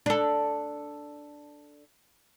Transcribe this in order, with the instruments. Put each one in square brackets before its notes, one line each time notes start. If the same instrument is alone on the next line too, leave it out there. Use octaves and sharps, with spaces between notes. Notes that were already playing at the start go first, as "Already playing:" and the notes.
[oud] D4 A4